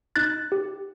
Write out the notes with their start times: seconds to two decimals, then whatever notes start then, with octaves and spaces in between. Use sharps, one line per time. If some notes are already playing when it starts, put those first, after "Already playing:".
0.16 D#4 F#6 A6
0.52 G4